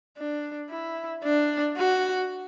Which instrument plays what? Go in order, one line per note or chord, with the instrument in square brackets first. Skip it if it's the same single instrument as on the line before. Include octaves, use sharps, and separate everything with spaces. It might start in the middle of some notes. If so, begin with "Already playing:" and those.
[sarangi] D4
E4
D4
F#4